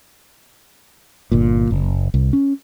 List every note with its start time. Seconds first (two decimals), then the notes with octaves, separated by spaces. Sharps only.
1.32 G1 A#2
1.71 F#1
2.14 C2
2.33 C#4